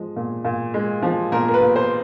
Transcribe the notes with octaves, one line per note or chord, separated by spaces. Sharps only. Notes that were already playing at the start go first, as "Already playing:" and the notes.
Already playing: F3 G#3
A#2
A#2
G#3
F3
A#2 A#4
A#4
B4
A#2
C5